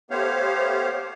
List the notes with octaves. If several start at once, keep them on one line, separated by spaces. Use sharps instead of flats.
A3 B3 G4 C5 C#5 F5